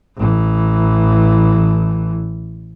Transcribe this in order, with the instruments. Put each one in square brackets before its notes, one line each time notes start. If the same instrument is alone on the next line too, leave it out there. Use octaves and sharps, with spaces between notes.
[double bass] A1 E3